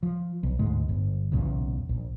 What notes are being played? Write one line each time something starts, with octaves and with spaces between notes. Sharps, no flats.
F3
B1
D2 G#2 G#3
G1
B1 E2 A#2 C#3
A#1